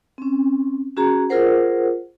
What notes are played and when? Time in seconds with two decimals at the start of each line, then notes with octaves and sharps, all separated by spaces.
0.18 C4 C#4
0.96 C#4 F#4 G#4 A#5
1.29 F4 G#4 A#4 C5 F#5